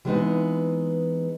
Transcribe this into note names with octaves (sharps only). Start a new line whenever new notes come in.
E3 G3 G#3 B3 C4 D#4